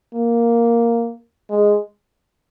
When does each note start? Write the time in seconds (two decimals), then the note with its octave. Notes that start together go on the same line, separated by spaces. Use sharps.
0.14 A#3
1.50 G#3